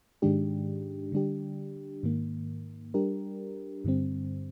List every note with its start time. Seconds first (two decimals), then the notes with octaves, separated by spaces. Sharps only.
0.22 G#2 D#3 G#3 D4 G4
1.12 D3 G3 D4 G4
2.03 G#2 D#3 A#3
2.94 G3 D4 G4 A#4
3.85 G2 D3 G3 C4